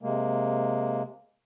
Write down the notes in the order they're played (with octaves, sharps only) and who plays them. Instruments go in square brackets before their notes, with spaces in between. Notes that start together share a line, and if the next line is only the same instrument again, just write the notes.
[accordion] C3 G#3 A#3